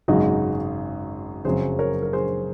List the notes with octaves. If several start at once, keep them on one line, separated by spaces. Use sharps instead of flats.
G#1 F#2 C#3 G#3 D#4 F#4
F#1 F2 C#3 F#3 G#4 C5
A#4 C#5
A#4
G#4 C5